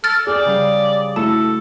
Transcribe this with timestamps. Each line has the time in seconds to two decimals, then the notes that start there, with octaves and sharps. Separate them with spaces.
0.04 A4 F6 A6
0.27 G#4 A4 D5 G5
0.45 C#3 G3 F5
1.16 A3 E4 F#4 A4 A5